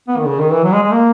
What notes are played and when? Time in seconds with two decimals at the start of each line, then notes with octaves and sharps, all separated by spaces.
0.08 B3
0.17 D#3
0.26 C#3
0.39 D#3
0.52 E3
0.64 F#3
0.72 G#3
0.83 G#3
0.92 A#3